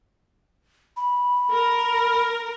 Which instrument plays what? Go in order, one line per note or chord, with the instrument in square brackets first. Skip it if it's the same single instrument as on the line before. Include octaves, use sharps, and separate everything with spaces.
[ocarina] B5
[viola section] A#4